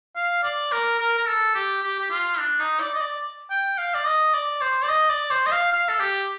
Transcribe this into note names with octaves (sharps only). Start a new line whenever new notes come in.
F5
D5
A#4
A#4
A#4
A4
G4
G4
G4
F4
D4
D#4
D5
D#5
D5
G5
F5
D5
D#5
D5
C5
D5
D#5
D5
C5
D#5
F5
F5
A4
G4